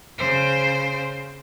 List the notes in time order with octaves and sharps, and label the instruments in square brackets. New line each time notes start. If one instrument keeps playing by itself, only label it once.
[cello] C#3 C5